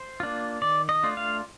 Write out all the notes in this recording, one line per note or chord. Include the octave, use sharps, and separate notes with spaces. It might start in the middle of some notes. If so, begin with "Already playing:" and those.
Already playing: C5
A#3 D4 F4
D#3 D5
D#5
A3 D4 F4
F5